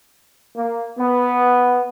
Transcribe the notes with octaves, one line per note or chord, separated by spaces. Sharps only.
A#3
B3